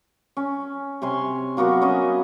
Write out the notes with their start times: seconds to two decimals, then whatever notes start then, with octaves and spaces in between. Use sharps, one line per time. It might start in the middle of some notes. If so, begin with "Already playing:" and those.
0.37 C#4
1.02 C3 C#5 G#5 C6
1.57 F#3 A#3 B3 F#4
1.82 C#4 B4 D#5 E5